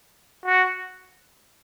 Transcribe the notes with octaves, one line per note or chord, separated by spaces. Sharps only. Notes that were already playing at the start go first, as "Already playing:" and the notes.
F#4